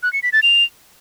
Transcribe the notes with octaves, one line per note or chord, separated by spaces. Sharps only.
F#6
C#7
B6
A6
F7